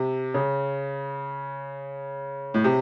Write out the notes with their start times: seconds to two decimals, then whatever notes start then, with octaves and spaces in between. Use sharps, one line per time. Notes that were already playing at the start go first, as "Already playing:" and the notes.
Already playing: C3
0.34 C#3
2.54 A2
2.64 C3